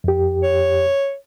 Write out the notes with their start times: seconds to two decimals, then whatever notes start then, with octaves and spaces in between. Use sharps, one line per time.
0.04 F2 G4
0.43 C#5